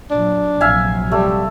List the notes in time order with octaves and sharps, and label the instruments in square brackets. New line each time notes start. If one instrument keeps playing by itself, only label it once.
[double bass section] A#2 F#3 [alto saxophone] D4
[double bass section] A#1 C3 F#3 [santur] E5 F5 G#5
[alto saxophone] G3 [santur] A3